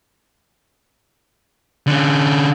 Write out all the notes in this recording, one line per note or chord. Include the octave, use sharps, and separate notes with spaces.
D3 C#4